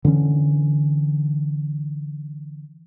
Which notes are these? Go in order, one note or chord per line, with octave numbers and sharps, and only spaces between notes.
D3 E3 C4 C#4